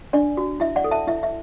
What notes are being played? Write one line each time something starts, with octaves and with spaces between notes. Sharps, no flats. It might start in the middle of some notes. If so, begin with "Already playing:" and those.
D4 D5
F#4
E4 E5
D5 F#5
A4
E5 A5
E4 E5
E5